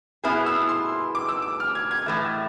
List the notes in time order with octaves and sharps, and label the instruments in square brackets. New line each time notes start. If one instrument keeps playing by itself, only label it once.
[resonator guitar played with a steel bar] B2 B3 E4 G#4 [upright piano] F6
[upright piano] E6
C6
D6
E6
D6
F6
G#6
G#6
[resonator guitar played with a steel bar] A2 E3 A3